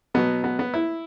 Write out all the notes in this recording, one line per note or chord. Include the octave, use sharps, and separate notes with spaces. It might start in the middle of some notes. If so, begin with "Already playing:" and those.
B2 F#3 B3
B3
B3
E4